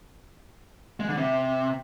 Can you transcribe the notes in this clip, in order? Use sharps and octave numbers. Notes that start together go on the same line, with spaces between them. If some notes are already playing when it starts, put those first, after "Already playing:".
G#3
D3
C3